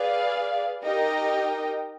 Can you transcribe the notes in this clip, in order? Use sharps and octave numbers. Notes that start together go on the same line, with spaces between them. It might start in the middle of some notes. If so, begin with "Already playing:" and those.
Already playing: G#4 B4 D5 F5
D#4 G4 A#4 D#5 G5